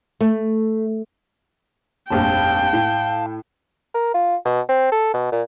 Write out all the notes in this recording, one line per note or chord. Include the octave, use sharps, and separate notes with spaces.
A3
F1 A#1 G2 F5 G5 A5
A2
A#4
F4
B2
C4
A4
B2
A#2